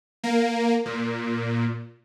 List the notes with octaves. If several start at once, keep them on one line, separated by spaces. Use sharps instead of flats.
A#3
A#2